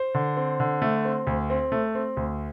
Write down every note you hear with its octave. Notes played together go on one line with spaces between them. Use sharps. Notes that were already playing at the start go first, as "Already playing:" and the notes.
Already playing: C5
D3
C4
D3
A3
C4
D2
C4
A3
C4
D2